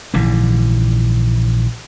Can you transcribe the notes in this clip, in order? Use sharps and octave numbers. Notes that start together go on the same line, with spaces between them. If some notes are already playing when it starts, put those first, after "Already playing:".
A#1 G#2 D3 E3